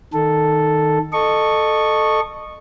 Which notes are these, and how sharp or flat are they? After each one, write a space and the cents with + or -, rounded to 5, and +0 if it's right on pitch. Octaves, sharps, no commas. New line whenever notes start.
D#3 +0 A4 +0
A4 +0 D#5 -25 C#6 +0